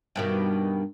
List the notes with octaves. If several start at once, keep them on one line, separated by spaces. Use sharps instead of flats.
G2 B2 D#3